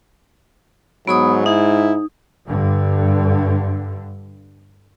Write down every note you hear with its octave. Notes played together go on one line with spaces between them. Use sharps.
G#2 F#3 B3 B5 D#6
D#4 E4
G2 D3